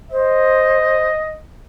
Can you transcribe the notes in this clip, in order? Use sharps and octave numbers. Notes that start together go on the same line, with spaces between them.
C5 D#5